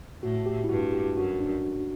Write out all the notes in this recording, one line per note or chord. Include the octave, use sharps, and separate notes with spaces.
A2 F#4
G4
E4
G2 F#4
G4
F#2 F#4
D4